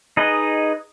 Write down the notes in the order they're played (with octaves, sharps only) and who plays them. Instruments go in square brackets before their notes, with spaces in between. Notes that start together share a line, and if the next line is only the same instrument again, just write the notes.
[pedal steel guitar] D#4 G#4 B4 D#5